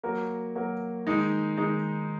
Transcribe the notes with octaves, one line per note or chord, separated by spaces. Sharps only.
F#3 A#3 F#4 A#4
F#3 A#3 F#4 A#4
D#3 G#3 D#4
D#3 G#3 D#4